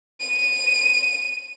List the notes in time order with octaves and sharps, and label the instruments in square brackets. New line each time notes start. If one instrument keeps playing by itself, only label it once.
[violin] D#7